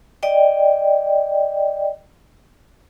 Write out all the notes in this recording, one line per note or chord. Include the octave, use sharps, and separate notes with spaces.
D5 D#5 G5